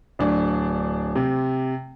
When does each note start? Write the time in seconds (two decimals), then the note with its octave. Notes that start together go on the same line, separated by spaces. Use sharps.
0.19 D1 D4
1.15 C3